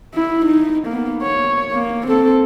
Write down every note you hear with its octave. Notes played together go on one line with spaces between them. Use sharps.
E4
D#4
A#3 B3
C#5
A#3
C4 A4